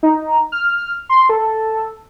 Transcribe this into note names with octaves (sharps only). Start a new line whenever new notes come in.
D#4
F6
C6
A4